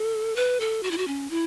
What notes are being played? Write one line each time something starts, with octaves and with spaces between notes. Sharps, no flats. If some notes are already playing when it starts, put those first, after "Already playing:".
Already playing: A4
B4
A4
F#4
E4
F#4
C#4
E4